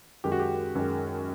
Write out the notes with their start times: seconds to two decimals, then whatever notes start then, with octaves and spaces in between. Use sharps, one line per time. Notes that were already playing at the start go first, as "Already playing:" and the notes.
0.24 F#2 D#3 G#3 G4
0.32 F#4
0.40 G4
0.75 F#2 D#3 G#3